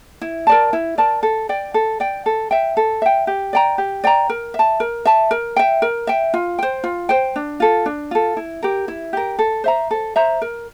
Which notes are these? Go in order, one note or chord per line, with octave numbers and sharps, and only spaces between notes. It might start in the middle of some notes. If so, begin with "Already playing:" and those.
E4
A#4 D5 A5
E4
A#4 D5 A5
A4
D5 G5
A4
D5 G5
A4
E5 G5
A4
E5 G5
G4
D5 G5 A#5
G4
D5 G5 A#5
A#4
E5 A5
A#4
E5 A5
A#4
E5 G5
A#4
E5 G5
F4
C5 G5
F4
C5 G5
D4
F4 A4
D4
F4 A4
E4
G4 A#4
E4
G4 A#4
A4
C5 E5 A#5
A4
C5 E5 A#5
A#4